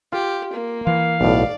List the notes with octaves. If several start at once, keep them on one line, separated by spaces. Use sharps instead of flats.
F4 G4
A#3
E3 F5
B1 A2 D5